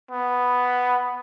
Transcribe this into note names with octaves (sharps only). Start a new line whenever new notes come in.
B3